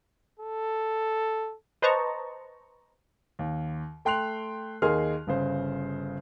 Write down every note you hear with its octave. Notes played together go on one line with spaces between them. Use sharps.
A4
B4 C5 D#5 A5 A#5 C#6
D#2
A3 G5 C6 F#6 C7 F7
D#2 D#4 G#4 A#4 C6 F6
G1 C#3 C5